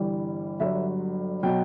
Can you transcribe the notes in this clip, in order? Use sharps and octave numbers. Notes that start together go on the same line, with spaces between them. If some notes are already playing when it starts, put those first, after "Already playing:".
Already playing: G1 G2 E3 G3
G1 G2 D3 F#3 E5
B2 F#3 G5